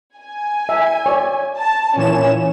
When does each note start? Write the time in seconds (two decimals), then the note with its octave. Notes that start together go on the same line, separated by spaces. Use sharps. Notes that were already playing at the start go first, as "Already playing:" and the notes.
0.17 G#5
0.69 E5
1.06 C#5 D5
1.58 A5
1.96 A#2 E3 C#4 E7